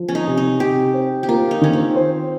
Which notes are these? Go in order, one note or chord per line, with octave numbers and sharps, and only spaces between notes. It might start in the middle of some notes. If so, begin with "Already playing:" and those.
Already playing: F3
C#4
D#4
C3
D#4
C3 G4
C4
G4
A#3 F4
D#4
D#3 C#4
C4
C5